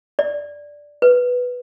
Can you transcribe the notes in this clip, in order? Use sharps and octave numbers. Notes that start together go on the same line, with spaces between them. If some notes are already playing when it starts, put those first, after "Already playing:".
D5
B4